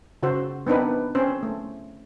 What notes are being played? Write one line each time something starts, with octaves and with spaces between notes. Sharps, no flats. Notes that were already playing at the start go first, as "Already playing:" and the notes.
C#3 F#4 C5
B3 C4 D4 D#4 B4
C4 C#4 C5
A3